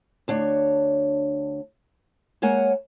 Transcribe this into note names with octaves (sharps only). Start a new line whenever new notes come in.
D2 D4 C#5
G#3 A#3 C#5 F#5 G#5